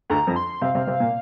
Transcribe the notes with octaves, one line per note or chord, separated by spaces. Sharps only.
D2 D3 A#5
F2 F3
C6
C3 C4 F5
C3 C4
C3 C4
A#2 A#3